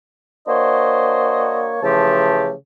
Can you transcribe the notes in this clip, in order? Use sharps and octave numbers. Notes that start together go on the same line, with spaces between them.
A#3 D4 F#4 C5 C#5 D#5
C#3 E3 F3 A3 G4 A5